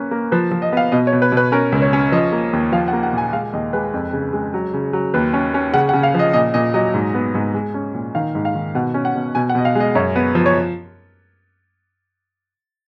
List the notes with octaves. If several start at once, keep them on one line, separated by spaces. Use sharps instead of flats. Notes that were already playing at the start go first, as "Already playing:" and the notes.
Already playing: A#3 C#4 B4
A#3
F3 B4
F3
D#5
B3 F5
B2 D#5
C#5
B2
B4
B2
B4
C#4 A#4
C#2
C#5
C#4
F3 D#5
A#3
D#2
F3 F5
F#5
A#3
F#5
A#2 G#5
G#3 F5
D#2 D#5
G#3 B4
F2
C#3
G#3
F#3
C#3
F#3
D#2 B4
C#4
C#4
C#3 F#5
F#5
C#3
F5
F3 D#5
A#2 D#5
A#2 D#5
F#3 D#5
G#2
B3
G#2
G#3
C#4
A#2
D#3 F5
G#2
F5
D#3
B2 F#5
C#4
F#5
B2
B2 G#5
F#5
B2 D#5
F5
G#3 D#5
F#2 C#5
B3
F3
C#5